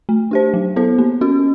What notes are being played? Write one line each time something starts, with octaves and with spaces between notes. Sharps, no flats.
A3
D4 G4 C5
F#3
B3 E4 A4 C5
A#3
C#4 F#4